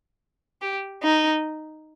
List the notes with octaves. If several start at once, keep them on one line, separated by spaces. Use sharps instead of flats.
G4
D#4